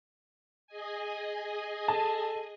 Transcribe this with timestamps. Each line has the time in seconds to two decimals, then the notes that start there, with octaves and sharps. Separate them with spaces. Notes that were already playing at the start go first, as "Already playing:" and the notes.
0.67 G#4 D#5 G#5
1.88 A4 A5